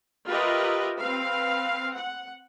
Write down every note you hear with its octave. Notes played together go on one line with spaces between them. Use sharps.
F4 G4 A#4 B4 D#5 E5
C4 B4 F5
F#5